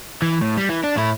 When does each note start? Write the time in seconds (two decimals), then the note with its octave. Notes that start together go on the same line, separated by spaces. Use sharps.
0.22 E3
0.41 A2
0.57 G3
0.69 E3
0.84 D4
0.97 A2 E4